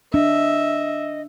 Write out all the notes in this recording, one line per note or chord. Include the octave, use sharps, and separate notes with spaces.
D4 D#5 E5